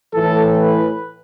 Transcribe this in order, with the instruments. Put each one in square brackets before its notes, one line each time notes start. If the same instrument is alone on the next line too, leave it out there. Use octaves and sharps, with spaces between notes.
[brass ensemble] A2 E3 A4
B4